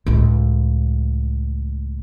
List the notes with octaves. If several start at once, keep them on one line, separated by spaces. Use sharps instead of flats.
C#2 A2